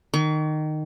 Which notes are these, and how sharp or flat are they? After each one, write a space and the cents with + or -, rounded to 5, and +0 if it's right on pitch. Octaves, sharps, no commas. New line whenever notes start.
D#3 -15 C#6 +45